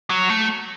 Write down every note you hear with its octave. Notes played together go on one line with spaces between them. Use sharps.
F#3
A3